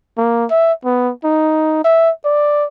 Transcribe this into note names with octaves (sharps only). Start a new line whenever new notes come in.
A#3
E5
B3
D#4
E5
D5